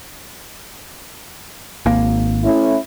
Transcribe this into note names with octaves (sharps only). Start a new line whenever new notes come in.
G#1 A#3
A3 C#4 E4